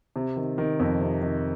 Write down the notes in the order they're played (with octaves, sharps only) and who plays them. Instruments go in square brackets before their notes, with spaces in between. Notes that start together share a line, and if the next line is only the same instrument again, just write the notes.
[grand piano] C3
D#3
D#3
F2
C3
D#3